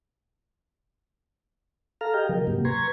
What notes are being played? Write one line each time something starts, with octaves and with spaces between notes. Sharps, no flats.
A4 F5 A#5 F6
G4 G#4 D#5 G5
C#3 F3 F#3 A#4
G#2 C3 F#3 A#3 G4
B4 A#5 C6 C#6 G#6